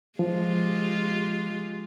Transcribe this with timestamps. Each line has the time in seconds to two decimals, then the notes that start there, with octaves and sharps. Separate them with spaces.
0.19 F3 G#3 F4 G4